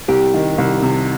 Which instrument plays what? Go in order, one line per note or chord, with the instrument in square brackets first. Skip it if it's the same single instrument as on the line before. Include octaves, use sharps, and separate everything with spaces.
[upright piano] C2 [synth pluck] G4
[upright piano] D#3
C2
C3